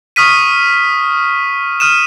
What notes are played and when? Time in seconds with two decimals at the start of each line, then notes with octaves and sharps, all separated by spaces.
0.16 C#6 D#6 F6 B6 D#7
1.80 D#6 F6 D#7 E7